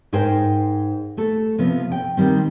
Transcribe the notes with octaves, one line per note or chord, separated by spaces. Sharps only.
G#2 G#4 A#4 C5 G5
A3 A4
C3 F3 B3
G5
D#3 G3 C4